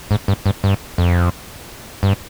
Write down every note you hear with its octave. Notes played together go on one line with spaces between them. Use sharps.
G#2
G2
G2
G2
F2
G2